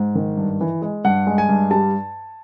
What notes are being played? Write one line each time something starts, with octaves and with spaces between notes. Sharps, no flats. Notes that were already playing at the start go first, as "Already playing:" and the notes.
Already playing: G#2
D#3
G2
E3
G#3
G2 F#5
G#3
G#5
G2
G3 A5